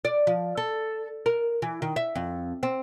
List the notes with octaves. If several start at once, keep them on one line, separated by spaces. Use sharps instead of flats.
D5
F3
A4
A#4
E3
D#3
E5
F2
C4